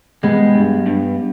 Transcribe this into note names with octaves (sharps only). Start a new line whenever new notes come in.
G3 G#3 B3
G2
G2